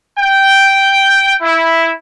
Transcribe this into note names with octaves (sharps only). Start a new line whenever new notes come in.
G5
E4